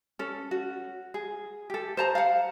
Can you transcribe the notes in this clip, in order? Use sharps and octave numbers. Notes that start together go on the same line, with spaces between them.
C#4 A4
F#4
G#4
G4 A4
C5 A5 A#5
F5 F#5